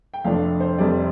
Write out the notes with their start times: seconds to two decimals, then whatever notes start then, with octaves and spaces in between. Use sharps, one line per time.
0.14 G5
0.24 F1 F2 F3 A3 D4 F5
0.60 C5
0.78 F1 F2 C3 G3 C4 D5